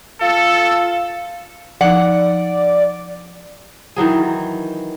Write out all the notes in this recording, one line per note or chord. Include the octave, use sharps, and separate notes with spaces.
F4 A4
F3 D#4 D5 F#5
D#3 E3 F#3 G#4